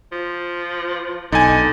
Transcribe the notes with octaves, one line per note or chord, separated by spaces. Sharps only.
F3
B1 D3 D#4 G#5